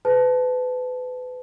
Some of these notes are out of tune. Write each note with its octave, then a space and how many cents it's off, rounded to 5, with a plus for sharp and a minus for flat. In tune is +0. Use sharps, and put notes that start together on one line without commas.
G#4 +15 B4 +30 A5 -10